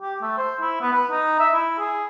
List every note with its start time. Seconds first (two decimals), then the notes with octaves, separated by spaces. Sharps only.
0.02 G4
0.22 A3
0.38 C5
0.61 E4
0.81 B3
0.93 B4
1.11 D#4
1.40 E5
1.54 E4
1.79 G#4